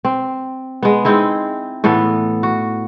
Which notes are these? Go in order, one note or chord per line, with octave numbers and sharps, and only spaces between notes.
C4
G#3 B3
G#3 C4 D#4 E4
A2 E3 B3 A4
F#4